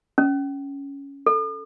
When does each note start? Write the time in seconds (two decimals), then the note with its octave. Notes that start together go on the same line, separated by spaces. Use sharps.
0.18 C#4
1.26 A4